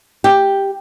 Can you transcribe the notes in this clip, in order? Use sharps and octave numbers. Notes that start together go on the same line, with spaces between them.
G4